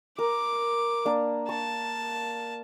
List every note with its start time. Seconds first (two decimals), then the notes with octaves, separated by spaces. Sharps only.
0.18 A#4 D6
1.05 A#3 D4 A#4
1.49 A5 C#6